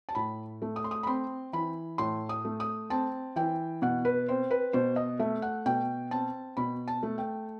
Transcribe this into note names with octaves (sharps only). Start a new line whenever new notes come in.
A5
A2 B5
A3
D#6
C6
D#6
B5
C4 C6
E3 B5
A2 C6
D#6
A3
D#6
C4 A5
E3 G5
B2 F#5
B4
C4 C5
B4
B2 C5
D#5
A3 E5
F#5
B2 G5
C4 A5
B2 B5
A5
A3
G5